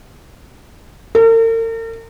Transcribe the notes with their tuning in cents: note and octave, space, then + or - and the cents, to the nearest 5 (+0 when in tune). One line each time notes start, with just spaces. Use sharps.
A#4 -45